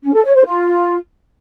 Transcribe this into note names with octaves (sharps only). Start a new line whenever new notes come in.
C#4
A4
C#5
C5
F4